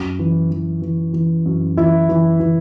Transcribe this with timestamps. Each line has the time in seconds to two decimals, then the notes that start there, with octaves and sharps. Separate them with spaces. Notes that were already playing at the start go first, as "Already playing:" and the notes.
Already playing: F#2
0.19 E3
0.51 E3
0.82 E3
1.14 E3
1.46 F#2
1.77 E3 E4 E5
2.09 E3
2.40 E3